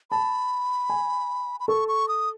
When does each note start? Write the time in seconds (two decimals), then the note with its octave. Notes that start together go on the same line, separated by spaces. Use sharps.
0.11 A5 B5
0.90 G#5
1.60 B5
1.68 A4 C#6
1.88 C#6
2.08 D#6